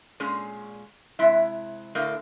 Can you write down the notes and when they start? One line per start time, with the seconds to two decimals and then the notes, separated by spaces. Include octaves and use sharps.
0.20 A#2 G#3 C#4 G#4
1.19 C3 G#3 E4 E5
1.95 A2 D3 A3 A#4 D#5 F5